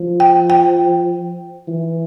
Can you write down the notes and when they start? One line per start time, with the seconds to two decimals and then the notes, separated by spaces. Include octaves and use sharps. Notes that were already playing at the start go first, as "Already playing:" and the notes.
Already playing: F3
0.20 G5
0.50 G5
1.68 E3